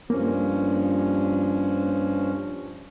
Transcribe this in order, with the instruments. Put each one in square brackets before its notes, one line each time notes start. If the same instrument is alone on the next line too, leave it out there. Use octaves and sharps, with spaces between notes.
[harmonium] G2 F3 C#4 [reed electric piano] A#3